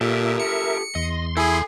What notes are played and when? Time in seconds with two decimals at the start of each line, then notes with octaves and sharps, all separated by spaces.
0.01 A#2 G4 A4 A#4 E5
0.40 C#7
0.95 E2 D#5 C6
1.37 E4 G#4 A4 G#5